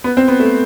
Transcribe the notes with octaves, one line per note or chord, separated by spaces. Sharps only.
B3
C4
B3
A3